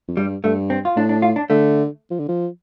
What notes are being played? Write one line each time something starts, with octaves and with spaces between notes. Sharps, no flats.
F2
G2 G3
G2 A3
C4
F4
A2 D4
D4
F4
D4
D3 A3
F3
D3
F3